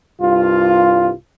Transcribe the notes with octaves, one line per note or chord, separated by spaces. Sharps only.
C2 G2 F4